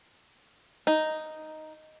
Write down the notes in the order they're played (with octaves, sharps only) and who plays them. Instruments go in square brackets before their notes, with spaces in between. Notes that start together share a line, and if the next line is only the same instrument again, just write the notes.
[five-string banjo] D#4